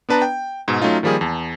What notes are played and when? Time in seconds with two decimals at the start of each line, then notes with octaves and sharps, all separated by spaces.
0.09 B3 D4 B4 A5 A#5
0.22 G5
0.68 G#2 B2
0.81 F#3 A3 C#4 D#4 F4
1.03 D#3 F3 G3 A#3 G#4
1.21 E2 A5